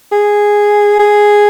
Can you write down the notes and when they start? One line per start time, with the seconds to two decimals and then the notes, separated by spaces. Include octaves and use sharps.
0.12 G#4
1.00 G#4